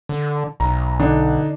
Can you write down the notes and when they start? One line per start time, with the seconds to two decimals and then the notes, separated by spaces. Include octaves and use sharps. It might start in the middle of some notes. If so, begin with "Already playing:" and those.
0.09 D3
0.60 B1 A#5
0.99 D3 D4 D#4